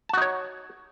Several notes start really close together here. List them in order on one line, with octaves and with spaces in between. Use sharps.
A5 F#4 D#4 C#5